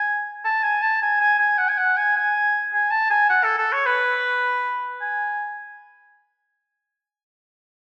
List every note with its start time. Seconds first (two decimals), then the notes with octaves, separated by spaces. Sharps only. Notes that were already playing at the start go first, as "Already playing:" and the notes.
Already playing: G#5
0.45 A5
0.63 G#5
0.82 A5
1.02 G#5
1.21 G#5
1.39 G#5
1.58 F#5
1.69 G#5
1.78 F#5
1.97 G#5
2.16 G#5
2.73 G#5
2.91 A5
3.10 G#5
3.30 F#5
3.44 A4
3.58 A4
3.72 C#5
3.86 B4
5.01 G#5